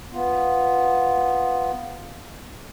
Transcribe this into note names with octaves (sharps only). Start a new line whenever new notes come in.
B3 F4